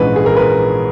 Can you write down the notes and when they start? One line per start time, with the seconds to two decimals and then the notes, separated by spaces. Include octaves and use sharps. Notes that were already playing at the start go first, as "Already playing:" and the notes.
Already playing: A#1 G#2 E3 G#3 C#4 B4
0.16 G#4
0.26 A#4
0.37 B4